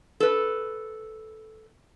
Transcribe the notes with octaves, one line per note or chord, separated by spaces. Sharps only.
A4 B4